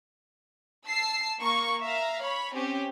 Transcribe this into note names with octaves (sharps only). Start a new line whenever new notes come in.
A5 E6 C7
A#3 C#6
E5 F5 A#5
C#5 B5
C4 C#4 G4